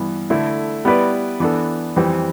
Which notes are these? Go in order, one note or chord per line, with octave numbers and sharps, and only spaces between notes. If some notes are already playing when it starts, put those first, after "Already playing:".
Already playing: G2 E3 B3
D3 A3 E4
G3 B3 E4 B4 D5
E3 B3 D4 A4
F2 E3 G3 C4